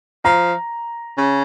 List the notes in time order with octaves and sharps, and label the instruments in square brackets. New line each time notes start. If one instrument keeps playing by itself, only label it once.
[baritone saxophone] F3 [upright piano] A#5
[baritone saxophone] C#3